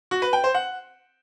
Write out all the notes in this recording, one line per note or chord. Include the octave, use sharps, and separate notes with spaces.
F#4
B4
G5
C5
F#5